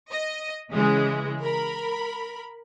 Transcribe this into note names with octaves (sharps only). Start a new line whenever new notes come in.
D#5
C#3 E3 G#3
A#4 B5